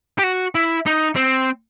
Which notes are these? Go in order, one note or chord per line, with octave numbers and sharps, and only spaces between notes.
G4
F#4
E4
D#4
C4